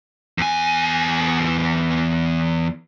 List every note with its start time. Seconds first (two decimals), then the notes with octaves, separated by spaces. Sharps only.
0.38 E2 G#5